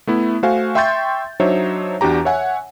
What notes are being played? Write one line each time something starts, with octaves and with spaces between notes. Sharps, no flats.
A3 B3 E4
A3 F#4 C5 F5 G#5
E5 G5 C6 C#6 G6 A6
F#3 D4 D#4 C5 C#5 E5
E2 D4 F#4 G4 A#5
C#5 E5 F#5 G#5